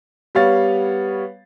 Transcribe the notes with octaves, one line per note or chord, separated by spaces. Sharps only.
G3 B3 C#5 F5 A6